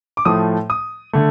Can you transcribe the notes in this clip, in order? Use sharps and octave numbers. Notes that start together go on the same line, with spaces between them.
D6
A2 F3 A3 D#6
D#6
D3 A3